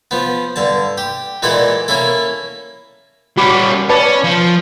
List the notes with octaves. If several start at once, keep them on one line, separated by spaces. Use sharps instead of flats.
F3 B3
G2 D3 A5
G4
A#2 E3 G#3 A4 D5 F#5
A#3 C#4 E4 A4
G3 C#4 F#4 B5 D6
C#4 B4 D5 A5
F3